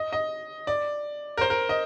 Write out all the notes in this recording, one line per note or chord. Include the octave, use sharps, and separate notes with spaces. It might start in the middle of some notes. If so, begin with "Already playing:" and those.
Already playing: D#5
D#5
D5
A#4
C5
A#4
D#5